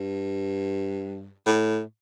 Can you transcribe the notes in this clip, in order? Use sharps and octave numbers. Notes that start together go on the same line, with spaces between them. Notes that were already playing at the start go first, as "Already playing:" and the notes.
Already playing: G2
A2